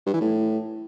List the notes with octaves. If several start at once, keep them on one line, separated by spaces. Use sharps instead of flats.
G2
E3
A2